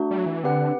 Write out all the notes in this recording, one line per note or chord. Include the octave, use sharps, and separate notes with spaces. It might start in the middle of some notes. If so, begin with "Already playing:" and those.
Already playing: A3 D4 F#4
G3
F#3
E3
D3 C4 G4 B4 F#5